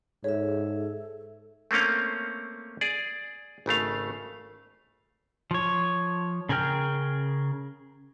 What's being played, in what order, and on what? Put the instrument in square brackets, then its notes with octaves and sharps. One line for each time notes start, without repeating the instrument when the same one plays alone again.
[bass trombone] G#2 [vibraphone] G#4 E5 [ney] A4 [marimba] C#5
[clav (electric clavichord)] A3 A#3 C4 C#4 F5
G#4 D5
G#1 C#3 A3 F5
[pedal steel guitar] F3 C#5
C#3 G#4 A#4 G5 F6